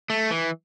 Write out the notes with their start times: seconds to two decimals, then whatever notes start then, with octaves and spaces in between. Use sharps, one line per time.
0.10 A3
0.31 E3